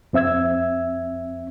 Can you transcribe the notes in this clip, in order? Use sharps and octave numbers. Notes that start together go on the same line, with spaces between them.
F2 C4 E5 E6 G#6